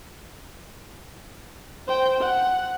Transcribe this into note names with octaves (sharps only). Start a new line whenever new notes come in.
C5 G5
F#5